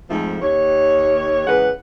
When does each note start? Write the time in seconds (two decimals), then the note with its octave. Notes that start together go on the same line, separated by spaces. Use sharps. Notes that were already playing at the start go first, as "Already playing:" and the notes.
0.08 F2 G#2 F3 A3 F4
0.42 D#2 C#5
1.47 E2 C#3 G#3 B4 F#5